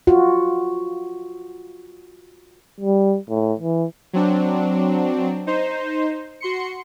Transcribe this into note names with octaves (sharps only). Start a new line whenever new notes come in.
F4 F#4
G3
A2
E3
F#3 C4 D4
D#4 C5
F#4 C6 C#7